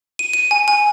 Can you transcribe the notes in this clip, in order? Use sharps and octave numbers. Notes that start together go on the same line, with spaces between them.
D#7
D#7
G#5
G#5